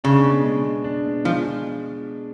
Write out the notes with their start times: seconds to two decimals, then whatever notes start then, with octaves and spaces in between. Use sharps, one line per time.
0.04 C#3 D4
0.24 B2
0.44 G#3
0.65 B2
0.84 D4
1.04 B2
1.25 F3 G#3